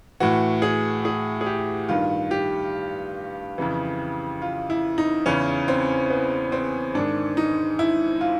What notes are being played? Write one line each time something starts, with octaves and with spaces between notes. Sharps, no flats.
A2 E3 F#4
G#4
G#4
G#4
G4
G2 D#3 F4
G4
F2 C#3 E3
F4
E4
D#4
E2 C#3 E3 C#4
C4
B3
C4
G#2 D#3 D4
D#4
E4
F4